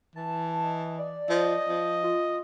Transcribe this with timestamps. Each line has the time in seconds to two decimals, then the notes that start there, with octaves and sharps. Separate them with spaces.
0.16 E3 A5
0.64 D#5
0.98 D5
1.29 F3 D#5
1.69 F3
2.03 F4